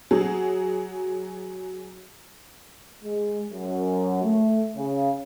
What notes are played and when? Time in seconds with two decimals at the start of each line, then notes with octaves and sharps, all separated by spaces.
0.11 F#3 G#4
3.04 G#3
3.50 F#2
4.23 A3
4.76 C#3